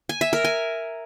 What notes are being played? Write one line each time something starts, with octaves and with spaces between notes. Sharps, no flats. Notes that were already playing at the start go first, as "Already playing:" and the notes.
G#5
E5
A#4
G#5